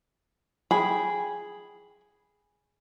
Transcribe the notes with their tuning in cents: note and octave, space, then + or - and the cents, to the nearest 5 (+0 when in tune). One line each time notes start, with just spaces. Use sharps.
G#4 +0 G5 +0 B5 +0